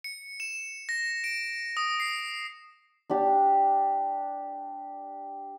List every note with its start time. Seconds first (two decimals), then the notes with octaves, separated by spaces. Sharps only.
0.04 C#7
0.40 E7
0.89 A#6
1.24 D7
1.77 D#6
2.00 C7
3.10 D4 G4